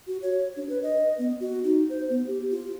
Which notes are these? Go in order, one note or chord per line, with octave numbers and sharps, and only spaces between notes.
F#4
C#5
D4
B4
D#5
B3
F#4
D#4
C5
B3
G4
F4